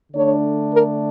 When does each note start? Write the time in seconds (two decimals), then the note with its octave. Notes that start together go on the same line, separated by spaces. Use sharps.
0.12 D3 A3 D4 C#5
0.72 A#4